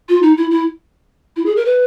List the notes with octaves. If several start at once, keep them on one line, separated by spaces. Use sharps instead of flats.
F4
D#4
E4
E4
E4
G#4
A#4
B4